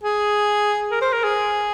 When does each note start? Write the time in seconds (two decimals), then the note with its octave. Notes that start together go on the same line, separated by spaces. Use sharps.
0.04 G#4
0.91 A#4
1.02 C5
1.13 A#4
1.24 G#4